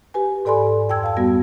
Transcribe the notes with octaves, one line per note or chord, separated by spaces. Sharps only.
G4 B4 G#5
G#2 A4 D5 G#5 B5 C6
F2 G5 A5 E6 G#6
F5 A5
G3 B3 F#4 A5